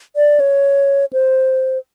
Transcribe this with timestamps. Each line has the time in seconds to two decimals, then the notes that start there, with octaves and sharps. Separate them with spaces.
0.16 D5
0.40 C#5
1.13 C5